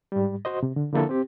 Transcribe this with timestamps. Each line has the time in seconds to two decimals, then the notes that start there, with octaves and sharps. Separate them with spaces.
0.12 G#2 G3
0.45 F#4 C5 D#5
0.63 C3
0.76 D3
0.93 D3 F3 A#3 E4 A4
1.09 C4 G4